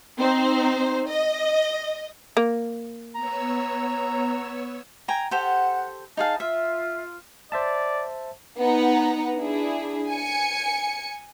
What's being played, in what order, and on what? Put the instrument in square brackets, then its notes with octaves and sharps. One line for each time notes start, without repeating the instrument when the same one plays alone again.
[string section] C4 D#4 C5
D#5
[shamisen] A#3
[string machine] B3 C#5 E6 [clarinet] A#5
[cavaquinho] G5 G#5 A#5
[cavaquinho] G4 A4 C5 [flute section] F#5
[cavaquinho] D#4 G#4 F5 [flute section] A5
[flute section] F4 [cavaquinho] E5
[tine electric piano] C5 E5 A5 [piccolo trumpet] D5
[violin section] B3 D#4 F#5 A#5
D4 E4 G#4
G#5 C#7